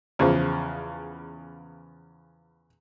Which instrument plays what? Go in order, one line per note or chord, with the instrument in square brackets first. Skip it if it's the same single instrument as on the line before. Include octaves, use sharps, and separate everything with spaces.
[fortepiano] E2 C#3 F3